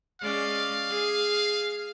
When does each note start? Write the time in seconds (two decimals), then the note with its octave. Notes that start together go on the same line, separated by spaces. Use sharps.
0.21 G#3 C#4 D5 F5
0.90 G#4